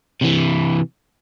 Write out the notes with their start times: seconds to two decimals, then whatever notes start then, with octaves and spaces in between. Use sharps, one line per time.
0.21 C3 E3